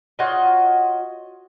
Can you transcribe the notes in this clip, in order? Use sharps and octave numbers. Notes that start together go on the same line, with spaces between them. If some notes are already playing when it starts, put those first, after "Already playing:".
F4 F#4 C#5 D#5